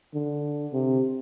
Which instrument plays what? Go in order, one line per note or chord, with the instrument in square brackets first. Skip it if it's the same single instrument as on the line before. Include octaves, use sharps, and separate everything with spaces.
[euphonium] D3
C3